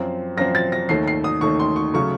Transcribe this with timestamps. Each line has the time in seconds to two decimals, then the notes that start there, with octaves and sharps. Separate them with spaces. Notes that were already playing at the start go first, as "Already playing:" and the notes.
Already playing: F#2 F3 C4
0.37 F#2 F3 C4 A#6
0.55 A6
0.72 A#6
0.89 D#2 D#3 A3 C7
1.08 C7
1.24 D#6
1.41 D#2 D#3 A3 C#6
1.60 C6
1.76 C#6
1.94 C#3 F#3 A3 C#4 C#6